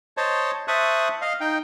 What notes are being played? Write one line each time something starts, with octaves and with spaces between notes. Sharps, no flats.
C5 C#5 D#5 A5
C5 E5 A5 C#6 D#6 F#6
D#5 F5
D#4 G5